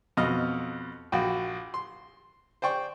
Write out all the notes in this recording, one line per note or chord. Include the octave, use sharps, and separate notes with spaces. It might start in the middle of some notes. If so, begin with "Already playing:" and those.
F2 B2 D#5 F6
A#1 F#4 G5
C6
C5 D5 G5 C#6